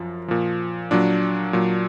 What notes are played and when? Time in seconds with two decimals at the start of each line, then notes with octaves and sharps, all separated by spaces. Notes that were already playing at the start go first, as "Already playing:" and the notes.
Already playing: F#2 F3
0.28 A#2 F3
0.91 A#2 F#3 D4
1.53 A#2 F#3